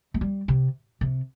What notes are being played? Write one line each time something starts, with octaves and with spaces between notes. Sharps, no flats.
A3
G3
C3
C3